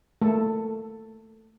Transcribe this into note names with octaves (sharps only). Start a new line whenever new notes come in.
A3 A#3 A4